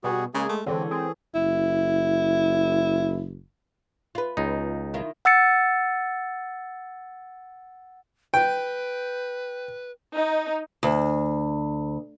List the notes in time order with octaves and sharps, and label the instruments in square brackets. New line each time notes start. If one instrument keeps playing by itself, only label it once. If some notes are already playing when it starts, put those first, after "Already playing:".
[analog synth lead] B2 [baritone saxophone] G3 [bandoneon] F#4 G#4
[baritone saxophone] C#3 [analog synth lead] G#3 [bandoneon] A#3 G#4
[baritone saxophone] A3
[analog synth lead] D3 [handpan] E3 A4 C#5 [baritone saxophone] G#3 [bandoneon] C4
[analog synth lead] C4 [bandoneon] G#4
[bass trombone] F#1 [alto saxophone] E4
[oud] F4 B4
[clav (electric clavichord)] C#2 D#4
[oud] D#3 E4 F4
[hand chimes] F#5 E6 A6 C#7
[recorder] B4 [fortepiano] G5
[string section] D#4
[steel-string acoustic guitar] D2